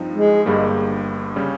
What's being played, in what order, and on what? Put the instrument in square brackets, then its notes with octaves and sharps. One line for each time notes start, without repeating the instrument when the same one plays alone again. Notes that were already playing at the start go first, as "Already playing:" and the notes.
Already playing: [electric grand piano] G2 F3 C4 D#4
[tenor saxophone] G#3
[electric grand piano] G1 G2 G3 A#3
C#3 G3 C#4